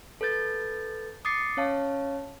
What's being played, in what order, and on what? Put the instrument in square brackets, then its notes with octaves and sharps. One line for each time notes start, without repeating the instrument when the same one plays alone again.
[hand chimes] A4 B4 G6 A6
D6 D#6 A6 C7 C#7
C#4 C#5 F5 A5